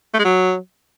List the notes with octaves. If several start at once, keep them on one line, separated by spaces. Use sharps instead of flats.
A3
G#3
F#3